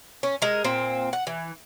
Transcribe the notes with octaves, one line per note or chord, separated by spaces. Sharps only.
C#4
G#3 A#4
A#2 C4
F#5
E3